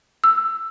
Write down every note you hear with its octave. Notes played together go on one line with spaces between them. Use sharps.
E6